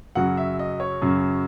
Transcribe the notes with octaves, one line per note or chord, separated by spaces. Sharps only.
F#2 C#3 F#3 F#5
E5
D#5
C#5
F#2 C#3 F#3